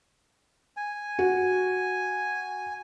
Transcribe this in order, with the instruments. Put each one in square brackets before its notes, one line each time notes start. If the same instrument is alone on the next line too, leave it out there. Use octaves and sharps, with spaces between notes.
[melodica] G#5
[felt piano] F#4